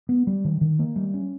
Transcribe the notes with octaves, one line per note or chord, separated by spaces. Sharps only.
B3
G3
D#3
D#3
A#3
G3
C#4